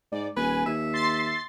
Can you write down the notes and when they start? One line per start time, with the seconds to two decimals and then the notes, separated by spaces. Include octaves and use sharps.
0.12 G#2 D5
0.36 D#1 B4 G#5
0.66 D#2 E5
0.93 C6 A6 C7